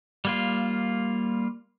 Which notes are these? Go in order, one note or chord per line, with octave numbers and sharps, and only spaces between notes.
G3 A#3 F4